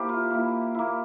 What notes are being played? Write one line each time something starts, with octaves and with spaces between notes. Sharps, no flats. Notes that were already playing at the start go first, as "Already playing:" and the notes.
Already playing: A#3 E4 G4 C5
F4
A#3 E4
A#3 E4